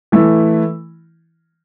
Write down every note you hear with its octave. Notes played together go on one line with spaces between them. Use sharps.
E3 A3 E4